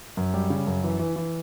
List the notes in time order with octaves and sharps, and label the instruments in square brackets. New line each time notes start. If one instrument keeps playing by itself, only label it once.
[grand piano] F#2
G3
C#3
F#2
E3
E3
E3